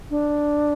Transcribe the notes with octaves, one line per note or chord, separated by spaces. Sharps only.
D4